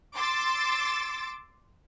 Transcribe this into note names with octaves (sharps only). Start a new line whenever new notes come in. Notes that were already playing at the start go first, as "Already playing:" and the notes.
C6 D6 E6 A6